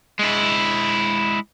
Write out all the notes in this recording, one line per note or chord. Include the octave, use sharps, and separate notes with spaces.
G#3 E4